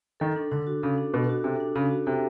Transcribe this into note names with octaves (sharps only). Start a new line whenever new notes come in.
D#3 A4
D4
D3 D4
F#4
C#3 A4
D4
B2 D4
F#4
C3 A4
D4
C#3 D4
F#4
C3 A4